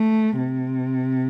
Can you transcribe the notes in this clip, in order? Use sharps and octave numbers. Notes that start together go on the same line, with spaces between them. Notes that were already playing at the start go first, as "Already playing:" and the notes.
Already playing: A3
C3